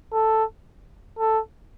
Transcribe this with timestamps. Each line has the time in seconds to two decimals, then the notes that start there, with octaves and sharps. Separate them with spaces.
0.13 A4
1.19 A4